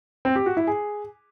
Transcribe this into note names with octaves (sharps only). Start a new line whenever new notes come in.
C4
G4
F#4
E4
G#4